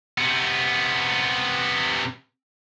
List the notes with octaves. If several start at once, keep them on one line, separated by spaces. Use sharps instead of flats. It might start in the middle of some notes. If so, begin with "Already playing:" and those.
C3 B3